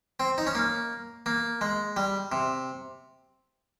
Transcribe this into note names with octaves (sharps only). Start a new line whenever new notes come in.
C4
D#4
C#4
A#3
A#3
G#3
G3
C3